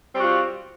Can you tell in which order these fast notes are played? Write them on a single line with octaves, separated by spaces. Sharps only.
C4 G3 F#4 F4